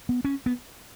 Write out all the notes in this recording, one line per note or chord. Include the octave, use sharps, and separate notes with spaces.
B3
C#4
B3